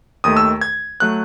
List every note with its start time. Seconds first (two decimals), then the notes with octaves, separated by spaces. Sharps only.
0.24 D#2 D#3 A3 D#6
0.37 E6
0.61 G#6
1.00 F#3 A3 F#6